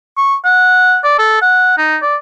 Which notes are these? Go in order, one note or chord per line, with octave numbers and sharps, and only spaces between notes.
C#6
F#5
D5
A4
F#5
D#4
D5